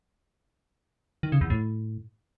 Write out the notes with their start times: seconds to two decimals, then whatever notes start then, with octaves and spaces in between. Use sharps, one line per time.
1.23 D#3
1.32 C#3
1.41 E2
1.50 A2